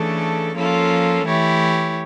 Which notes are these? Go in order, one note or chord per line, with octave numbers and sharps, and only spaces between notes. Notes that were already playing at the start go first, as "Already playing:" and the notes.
Already playing: C#3 E3 A3 D4 A4
F3 A#3 C#4 F4 A4
E3 A3 E4 G4 C#5